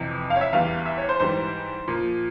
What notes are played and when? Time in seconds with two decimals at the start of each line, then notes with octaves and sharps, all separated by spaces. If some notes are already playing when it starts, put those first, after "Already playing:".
Already playing: F2 C3 E3
0.30 F5
0.36 C#5
0.41 E5
0.53 E2 E3 G3 F5
0.86 E5
0.98 C#5
1.09 C5
1.20 G#2 E3 G3 C5
1.88 A#2 F3